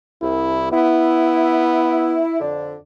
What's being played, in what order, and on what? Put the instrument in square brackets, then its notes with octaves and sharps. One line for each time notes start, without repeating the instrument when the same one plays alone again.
[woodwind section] C2 [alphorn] E4
[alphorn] B3 [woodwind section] E4
[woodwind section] F2 D3 D4